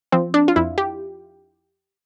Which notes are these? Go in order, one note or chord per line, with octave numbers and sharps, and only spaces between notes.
F3 C4
D4
F4
F2 E4
G4